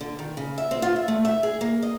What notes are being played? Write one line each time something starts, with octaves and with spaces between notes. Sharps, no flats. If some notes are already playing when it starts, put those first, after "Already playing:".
D3
D#3
C#3
E5
C4
F4
E5
A3
E5
G#4
A#3
D#5